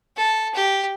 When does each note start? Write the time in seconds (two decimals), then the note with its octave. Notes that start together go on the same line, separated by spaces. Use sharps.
0.17 A4
0.54 G4